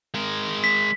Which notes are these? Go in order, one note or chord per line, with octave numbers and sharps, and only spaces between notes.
G#3 A#4
B6